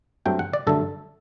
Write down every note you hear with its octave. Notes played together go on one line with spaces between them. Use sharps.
G2 F#3 A3 C4 G5
F#5
D5
G2 D3 F#3 A3 A4